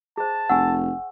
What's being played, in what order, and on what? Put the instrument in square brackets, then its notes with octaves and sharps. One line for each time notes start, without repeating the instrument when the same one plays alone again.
[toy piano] G#4 C5 [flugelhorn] A5
[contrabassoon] F1 [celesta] F#5 [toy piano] G#5 C#6 E6